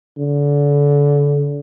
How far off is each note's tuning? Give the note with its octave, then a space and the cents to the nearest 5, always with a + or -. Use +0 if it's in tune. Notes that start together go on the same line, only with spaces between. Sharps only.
D3 -30